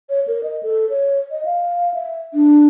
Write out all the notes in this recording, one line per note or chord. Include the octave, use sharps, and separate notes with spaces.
C#5
A#4
D#5
A4
C#5
D#5
F5
E5
D4